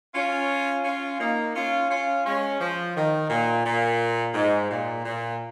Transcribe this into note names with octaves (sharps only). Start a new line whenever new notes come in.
C#4 F4
C#4 F4
A#3 D#4
C#4 F4
C#4 F4
G#3 C#4
F3
D#3
A#2
A#2
G#2
A#2
A#2